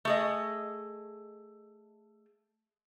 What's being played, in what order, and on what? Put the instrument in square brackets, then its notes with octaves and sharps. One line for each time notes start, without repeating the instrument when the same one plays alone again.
[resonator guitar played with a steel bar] A3 G#4 D#5